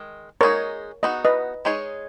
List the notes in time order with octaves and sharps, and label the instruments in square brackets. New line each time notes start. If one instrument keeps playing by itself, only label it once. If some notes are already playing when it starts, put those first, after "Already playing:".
Already playing: [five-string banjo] D#3 G#3
[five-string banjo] G#3 D#4 G#4 [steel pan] A#4 C#5
[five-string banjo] B3 D#4 F#4 [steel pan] D#5
[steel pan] B4 D#5
[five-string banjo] G#3 D#4 G#4 C#5